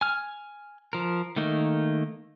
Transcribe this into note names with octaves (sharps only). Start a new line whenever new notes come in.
G#5 F6
F3 A#4
D#3 A3 A#3 D#4